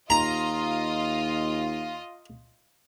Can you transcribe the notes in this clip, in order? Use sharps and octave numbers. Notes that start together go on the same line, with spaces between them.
D#2 F4 D#5 A#5